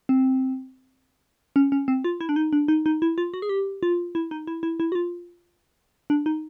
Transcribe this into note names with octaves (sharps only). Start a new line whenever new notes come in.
C4
C#4
C#4
C4
F4
E4
D4
D#4
D4
D#4
D#4
E4
F4
F#4
G#4
G4
F4
E4
D#4
E4
E4
E4
F#4
F4
D4
D#4